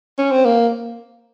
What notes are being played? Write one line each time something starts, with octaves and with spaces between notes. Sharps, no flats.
C#4
C4
A#3